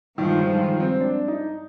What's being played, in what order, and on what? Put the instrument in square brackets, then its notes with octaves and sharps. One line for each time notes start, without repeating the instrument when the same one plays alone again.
[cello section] G2 F3 G#3 [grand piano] D#3
[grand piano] D#3
D#3
C4
D4
D#4